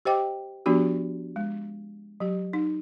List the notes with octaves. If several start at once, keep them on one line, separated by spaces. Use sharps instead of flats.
G4 C5 D#5 G5 D6
F3 B3 D4 F#4 G4
G#3
F#3 G4
D#4